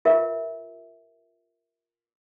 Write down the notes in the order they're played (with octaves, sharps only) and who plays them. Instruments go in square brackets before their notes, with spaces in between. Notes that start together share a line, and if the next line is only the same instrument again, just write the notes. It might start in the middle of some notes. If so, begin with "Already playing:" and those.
[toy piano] F4 G4 A#4 B4 E5 F5